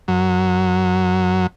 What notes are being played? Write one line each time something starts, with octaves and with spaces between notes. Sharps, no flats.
F#2 F#3